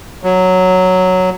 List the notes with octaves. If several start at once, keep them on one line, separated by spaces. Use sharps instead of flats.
F#3